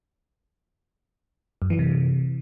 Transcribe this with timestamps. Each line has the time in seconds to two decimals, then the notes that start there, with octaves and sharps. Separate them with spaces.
1.62 F#2
1.70 E3
1.79 C3